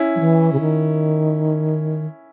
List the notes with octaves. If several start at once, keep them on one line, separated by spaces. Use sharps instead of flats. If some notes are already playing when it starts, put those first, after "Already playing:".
Already playing: C#4 E4
F#3
E3
C#3
D#3